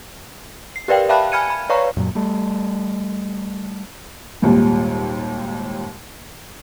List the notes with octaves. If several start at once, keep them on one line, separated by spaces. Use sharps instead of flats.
C7
G4 A#4 B4 D5 F5 G5
E5 F5 G5 A5 B5 F#6
G#5 B5 F6 G#6 C#7 D#7
B5
B4 C#5 D5 F5 A#5 C#6
F#2 A#2 F#3
G3 A3
G#1 D#2 A#2 G3